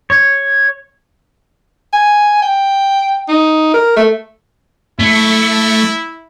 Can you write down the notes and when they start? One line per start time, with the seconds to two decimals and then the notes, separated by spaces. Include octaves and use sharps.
0.10 C#5
1.93 G#5
2.42 G5
3.29 D#4
3.74 A#4
3.96 A3
5.00 A3 E4